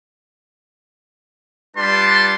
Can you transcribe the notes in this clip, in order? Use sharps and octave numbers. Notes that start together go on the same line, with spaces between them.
G3 D4 F4 B4 A5 C6